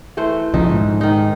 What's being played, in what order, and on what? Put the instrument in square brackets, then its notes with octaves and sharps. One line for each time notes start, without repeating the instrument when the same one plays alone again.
[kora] E3 A3 C5
[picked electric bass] A#1 C#3 F3 [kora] D#4
[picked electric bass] G#2
[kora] D#3 D#4